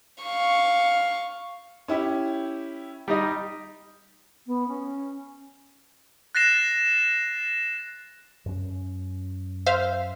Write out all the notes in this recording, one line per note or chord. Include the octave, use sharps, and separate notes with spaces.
F5 C#6
C#4 E4 G4
G3 D#4 D#5
B3
C#4
F#6 A6 A#6 C7 E7
F#2 C#4
C5 E5 F5